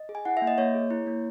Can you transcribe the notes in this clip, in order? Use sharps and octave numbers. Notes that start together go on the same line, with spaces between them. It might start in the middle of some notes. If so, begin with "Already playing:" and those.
Already playing: D#5
G#4
G#5
E4 F#5
E5
A#3
D#5
A#3 C#5
G#4
E4
A#3